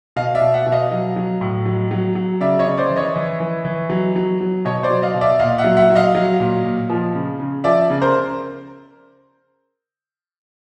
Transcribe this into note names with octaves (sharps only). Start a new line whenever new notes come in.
B2 D#5 F5
D5 E5
B2
E5 F#5
B2
D#5 F5
F#3
F#3
A2
F#3
F#3
F#3
C#3 D5 E5
C#5 D#5
C#3
C5 D5
E3
C#5 D#5
E3
E3
E3
F#3
F#3
F#3
B2 C#5 D#5
C5 D5
F#3
D#5 F5
B2
D5 E5
A#2 D#5 F5
E5 F#5
F#3
E5 F#5
F#3
D#5 F5
F#3
A#2
A#2
F3
C#3
C#3
F3 D5 E5
C#3
A#4 C5